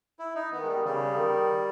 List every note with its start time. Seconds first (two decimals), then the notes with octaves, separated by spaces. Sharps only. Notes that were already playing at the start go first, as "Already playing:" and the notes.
0.19 E4
0.35 D#4
0.52 D#3 B3
0.63 G#3
0.68 G3
0.85 C#3 G3
1.17 D#3